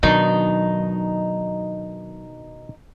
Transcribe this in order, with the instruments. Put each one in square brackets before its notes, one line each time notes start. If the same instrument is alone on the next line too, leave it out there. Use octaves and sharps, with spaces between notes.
[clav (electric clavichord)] B2 D#3 D4 [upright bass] F#3 [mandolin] D#4